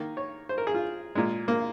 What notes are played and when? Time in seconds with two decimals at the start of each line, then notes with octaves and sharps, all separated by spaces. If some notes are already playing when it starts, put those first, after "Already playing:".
Already playing: D#3 A#3
0.17 C#5
0.49 C5
0.58 A#4
0.67 G#4
0.74 F4
1.15 A#2 G#3
1.48 A#3